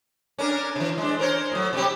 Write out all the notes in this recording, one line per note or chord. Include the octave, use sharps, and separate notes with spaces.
C#4 D4 A#4
C3 E3
G#3 D4
A#4 C5 C#5
A2 F#3
C3 G3 G4